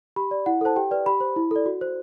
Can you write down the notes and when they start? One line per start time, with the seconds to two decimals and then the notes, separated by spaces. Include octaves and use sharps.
0.16 G4 B5
0.31 D5
0.46 E4 F#5
0.61 A4 C5 A5
0.76 G4 G5
0.91 B4 D5
1.06 G4 B5
1.21 C5
1.36 E4
1.51 A4 D5
1.66 F#4
1.81 C5